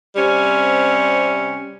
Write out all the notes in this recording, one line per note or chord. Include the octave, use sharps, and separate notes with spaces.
C3 G3 C4 C#4